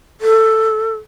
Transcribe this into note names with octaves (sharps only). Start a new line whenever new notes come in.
A4